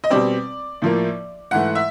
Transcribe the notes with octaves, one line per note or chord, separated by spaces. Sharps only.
D#5
B2 G3 C4 D5
A2 F3 A#3
G#2 E3 A3 F#5
E5